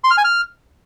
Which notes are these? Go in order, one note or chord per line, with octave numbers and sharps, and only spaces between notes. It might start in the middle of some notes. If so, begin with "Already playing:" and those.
C6
F6
G#5
F6